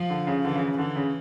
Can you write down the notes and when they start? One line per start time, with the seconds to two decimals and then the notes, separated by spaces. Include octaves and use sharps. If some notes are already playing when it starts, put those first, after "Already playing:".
Already playing: F3
0.10 D3
0.27 C#3
0.44 D3 E3
0.56 C#3
0.67 C#3
0.78 D3 E3
0.96 C#3